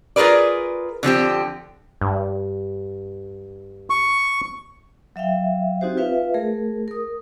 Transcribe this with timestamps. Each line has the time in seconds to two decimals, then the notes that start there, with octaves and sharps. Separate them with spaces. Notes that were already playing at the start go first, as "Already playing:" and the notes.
0.16 F4 G#4 A#4 B4 D5
1.03 D3 F3 C4 G4
2.01 G2
3.90 C#6
5.16 F#3 E5 F5 G5
5.81 C4 D#4 F#4 G4 C5
5.97 F4 B4 E5 F5
6.34 A3 G#4 A#4
6.88 A#4 D#6